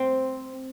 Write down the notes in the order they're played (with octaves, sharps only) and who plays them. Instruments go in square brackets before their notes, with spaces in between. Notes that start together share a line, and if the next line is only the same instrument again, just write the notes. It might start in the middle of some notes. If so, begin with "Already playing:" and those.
Already playing: [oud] C4